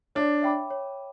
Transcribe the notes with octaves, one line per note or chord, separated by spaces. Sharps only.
D4 C#5
E5 G5 B5 D6
C#5